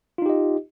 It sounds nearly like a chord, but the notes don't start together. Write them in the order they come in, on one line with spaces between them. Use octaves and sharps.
F4 D#4 G4 D#5